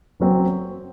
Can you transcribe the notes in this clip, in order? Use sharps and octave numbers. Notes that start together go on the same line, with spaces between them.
F#1 F#2 F#3 C4